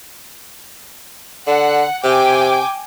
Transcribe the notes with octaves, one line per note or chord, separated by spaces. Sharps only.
D3 F#5
C3 G5 G#5 D6